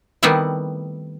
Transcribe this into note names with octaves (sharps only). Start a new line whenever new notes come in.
D#3 G3 A3 B3 C4 E4